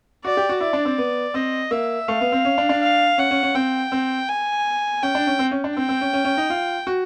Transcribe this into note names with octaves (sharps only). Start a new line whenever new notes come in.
F#4 D5
G4
F#4
E4 D5
D4
C4
B3
C4 D#5
A#3 E5
A3 F5
B3
C4
C#4
D4
D4
F5
C#4 F#5
C#4
C#4
C4 G5
C4
G#5
C#4 G5
D4
C#4
C4
C#4
D4
C4 G5
C4
C#4
C#4
C#4
D#4
F4
F#4